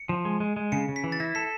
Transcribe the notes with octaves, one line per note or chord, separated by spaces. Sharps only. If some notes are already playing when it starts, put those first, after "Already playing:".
Already playing: C#7
F3
G#3
G#3
G#3
C#3 C#7
C#3
B6
E3
A6
E4 A#6
A4 B6